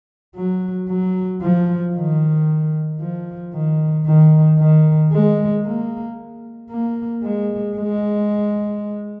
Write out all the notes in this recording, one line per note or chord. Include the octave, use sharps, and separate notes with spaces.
F#3
F#3
F3
D#3
F3
D#3
D#3
D#3
G#3
A#3
A#3
G#3
G#3